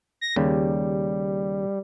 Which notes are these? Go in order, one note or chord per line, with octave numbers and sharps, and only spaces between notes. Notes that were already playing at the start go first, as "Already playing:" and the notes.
A#6
D#2 C#3 G3